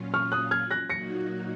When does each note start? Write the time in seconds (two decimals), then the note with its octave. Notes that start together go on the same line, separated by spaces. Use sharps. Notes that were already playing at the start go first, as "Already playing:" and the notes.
Already playing: A#2 F#3 C#4 F4
0.14 C#6 F6
0.32 D#6 F#6
0.51 F6 G#6
0.71 F#6 A#6
0.90 A#2 F#3 A#3 D#4 F#4 A#6 C#7